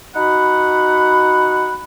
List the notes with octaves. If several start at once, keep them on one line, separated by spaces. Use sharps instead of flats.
D#4 F#4 F#5 B5